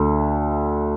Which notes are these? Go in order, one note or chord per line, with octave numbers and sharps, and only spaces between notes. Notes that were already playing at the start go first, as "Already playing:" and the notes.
Already playing: D2 A3